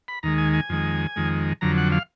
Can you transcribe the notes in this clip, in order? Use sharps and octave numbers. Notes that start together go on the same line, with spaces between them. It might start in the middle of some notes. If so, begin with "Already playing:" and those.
B5
D#2 D#3 G#3 A#5
G#5
G#5
F2 D#3 G#3
F2 D#3 G#3
F2 D3 F#3 A#5
F#5
F5